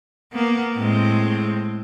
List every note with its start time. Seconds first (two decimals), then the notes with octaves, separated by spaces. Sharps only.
0.32 A#3 B3
0.77 A2 G#3 C4